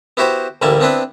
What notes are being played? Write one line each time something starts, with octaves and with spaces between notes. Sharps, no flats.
B3 E4 F#4 G4 C5
A1 D2 G3 A#3 E4 A5
B3 C4 D4 E4 B4